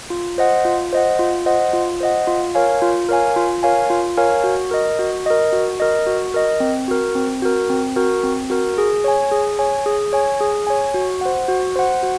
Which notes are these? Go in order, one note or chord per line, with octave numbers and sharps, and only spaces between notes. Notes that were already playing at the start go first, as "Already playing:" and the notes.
F4
C5 D#5 F#5
F4
C5 D#5 F#5
F4
C5 D#5 F#5
F4
C5 D#5 F#5
F4
A#4 C#5 F5 G#5
F4
A#4 C#5 F5 G#5
F4
A#4 C#5 F5 G#5
F4
A#4 C#5 F5 G#5
F#4
A#4 D#5
F#4
A#4 D#5
F#4
A#4 D#5
F#4
A#4 D#5
C4
F#4 A#4
C4
F#4 A#4
C4
F#4 A#4
C4
F#4 A#4
G#4
C#5 G#5
G#4
C#5 G#5
G#4
C#5 G#5
G#4
C#5 G#5
F#4
C5 F#5
F#4
C5 F#5
F#4